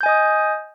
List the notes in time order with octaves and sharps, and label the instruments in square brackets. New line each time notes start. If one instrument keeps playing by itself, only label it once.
[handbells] G6
G#5
D#5
D#6